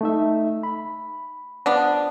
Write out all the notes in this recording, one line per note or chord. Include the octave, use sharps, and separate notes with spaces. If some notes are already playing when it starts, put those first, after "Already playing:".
A3 D#4 E5
B5
F3 B3 D4